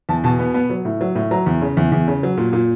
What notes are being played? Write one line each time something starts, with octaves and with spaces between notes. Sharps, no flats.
E2 A5
B2 A5
B3
B3
F#3
A2
F#3
A2
F#3 A#5
E2
C#3
E2
E2
C#3
F#3
A#2
A#2